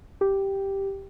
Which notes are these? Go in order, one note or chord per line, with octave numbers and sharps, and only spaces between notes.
G4